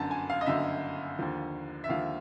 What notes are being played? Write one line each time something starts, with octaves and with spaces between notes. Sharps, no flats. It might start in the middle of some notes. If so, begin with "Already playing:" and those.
Already playing: G1 F#2 D3 A5
G#5
F5
D#5
G1 F#2 D3 E5
D#2 D3 F3
E5
D#2 D3 F3 F5